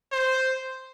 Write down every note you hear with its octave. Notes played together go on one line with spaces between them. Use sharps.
C5